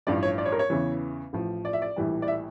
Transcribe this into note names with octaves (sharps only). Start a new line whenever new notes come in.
A1 G2 F3 D5
C#5
D5
C#5
A#4
C#5
E2 C#3 E3
A1 A2 F3
D5
E5
D5
A#1 A2 E3 G3
D5
E5